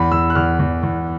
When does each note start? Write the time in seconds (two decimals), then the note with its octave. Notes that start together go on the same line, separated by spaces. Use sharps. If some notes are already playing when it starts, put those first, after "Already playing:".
Already playing: E2 B5
0.12 E2 E6
0.30 F#6
0.35 E2 F6
0.59 E2
0.83 E2